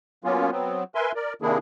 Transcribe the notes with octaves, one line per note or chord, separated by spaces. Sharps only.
F#3 A#3 B3 C#4 F4
F#3 B3 C4
A#4 B4 E5 G#5 C6
A#4 D5
C3 D#3 A#3 D4 E4 G#4